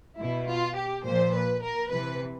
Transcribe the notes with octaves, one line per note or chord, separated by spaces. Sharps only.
B2 E4
F4
G4
A#2 F3 C5
B4
A#4
C3 E3 B4